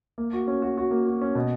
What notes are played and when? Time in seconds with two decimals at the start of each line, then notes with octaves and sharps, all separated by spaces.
0.18 A#3
0.33 F#4
0.48 C#4
0.62 F#4
0.77 F#4
0.91 A#3
1.07 F#4
1.21 C#4
1.35 B2